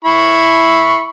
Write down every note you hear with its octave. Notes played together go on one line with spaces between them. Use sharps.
E4 B5 C#6